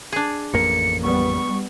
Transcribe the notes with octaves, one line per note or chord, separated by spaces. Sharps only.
D4 G#4
A1 F2 A#3 C#7
G3 B3 C#6